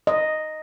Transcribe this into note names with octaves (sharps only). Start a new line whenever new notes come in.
D#5